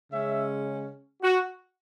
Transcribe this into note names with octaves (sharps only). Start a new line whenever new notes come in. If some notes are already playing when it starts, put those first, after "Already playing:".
C#3 G#3 C#4 E5
F#4